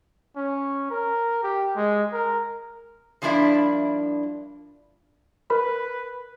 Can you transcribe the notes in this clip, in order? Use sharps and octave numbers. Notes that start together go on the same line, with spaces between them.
C#4
A#4
G4
G#3
A#4
G2 F3 A#3 D4 E4
A#4 B4 B5